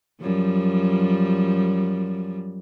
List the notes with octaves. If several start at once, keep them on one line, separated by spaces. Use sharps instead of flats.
F#2 F3 G3